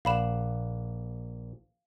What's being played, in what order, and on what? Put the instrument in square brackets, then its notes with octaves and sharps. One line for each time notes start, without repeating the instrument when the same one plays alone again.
[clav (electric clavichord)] A#1 D5 F#5 [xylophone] F5 B5 E7